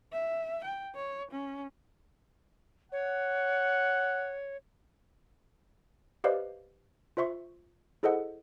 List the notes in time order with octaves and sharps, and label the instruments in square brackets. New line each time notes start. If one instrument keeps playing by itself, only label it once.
[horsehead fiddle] E5
G5
C#5
C#4
[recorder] C#5 [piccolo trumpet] F#5
[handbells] G4 B4 C5 D5 D#5 F5
F4 C5 E5 C6 C#6
E4 G#4 A4 C5 D#5 F#5